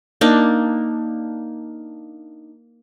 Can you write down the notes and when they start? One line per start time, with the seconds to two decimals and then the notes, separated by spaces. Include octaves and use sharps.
0.21 A#3 D4 D#4